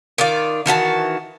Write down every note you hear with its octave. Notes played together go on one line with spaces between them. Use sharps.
D#3 F4 D5
D#3 E3 F#4 A5